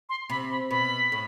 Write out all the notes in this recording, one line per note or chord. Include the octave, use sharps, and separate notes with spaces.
C6
C3 B5
B5
B2 B5
A2